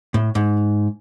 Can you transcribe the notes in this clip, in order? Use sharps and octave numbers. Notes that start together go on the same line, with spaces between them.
A2
G#2